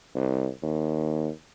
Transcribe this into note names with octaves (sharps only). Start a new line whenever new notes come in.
C2
D#2